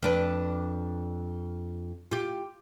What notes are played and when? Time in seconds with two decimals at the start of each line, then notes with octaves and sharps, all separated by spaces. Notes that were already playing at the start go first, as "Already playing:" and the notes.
0.03 F2 D4 B4
2.11 F4 G4